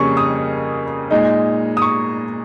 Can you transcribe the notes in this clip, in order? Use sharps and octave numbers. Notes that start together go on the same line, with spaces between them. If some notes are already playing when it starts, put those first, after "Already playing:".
Already playing: F2 C#3 G3 A#3 C#4 C#6
D#6
A#2 G#3 D#4
D#6
C#6